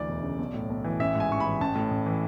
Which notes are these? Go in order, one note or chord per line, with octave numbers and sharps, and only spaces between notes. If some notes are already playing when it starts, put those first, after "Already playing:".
Already playing: D2 E3 D5
E1
C#3
B1
A2
B1
E3
A1 E5
G#2
G#5
A1 C#6
E3 B5
A1 A5
A2
A1
E3